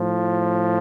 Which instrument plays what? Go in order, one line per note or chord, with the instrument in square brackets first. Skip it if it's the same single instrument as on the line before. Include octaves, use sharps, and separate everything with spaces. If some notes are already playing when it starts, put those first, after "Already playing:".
Already playing: [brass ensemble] A2 F3